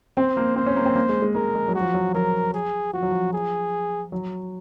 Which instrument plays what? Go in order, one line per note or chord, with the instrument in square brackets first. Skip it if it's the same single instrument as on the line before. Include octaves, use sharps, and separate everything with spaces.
[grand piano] C4 [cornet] C5
[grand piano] A#3
[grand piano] C4 [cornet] C5
[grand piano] C#4
A#3
C4
A#3
G#3
G#3
[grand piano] G#3 [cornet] A#4
[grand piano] G#3
F#3
[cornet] F#4
[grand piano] F3
F#3
[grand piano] F#3 [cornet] A#4
[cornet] G#4
[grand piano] F3 [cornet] F#4
[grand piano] F#3
F3
[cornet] G#4
[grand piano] F#3